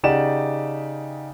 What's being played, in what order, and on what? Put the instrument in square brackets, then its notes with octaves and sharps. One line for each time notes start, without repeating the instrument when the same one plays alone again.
[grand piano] C#3 D#4 G4 D5 F#5 E7